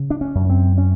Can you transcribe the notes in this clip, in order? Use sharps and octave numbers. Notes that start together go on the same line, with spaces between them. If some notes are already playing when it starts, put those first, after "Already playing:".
Already playing: C#3
D4
C#4
F#2
C4
C#4